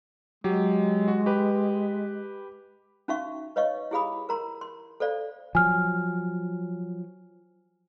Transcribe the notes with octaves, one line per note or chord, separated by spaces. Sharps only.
F#3 G#3 G4
F#4
G4 B4
C#4 D#4 F#4 E5 F5 C#6
B4 C#5 D#5 F5 C#6
E4 G4 G#4 F5 B5 D#6
A#4 A#5 C6
C6
A4 C5 D5 F5
F3 F#3 G#5 F6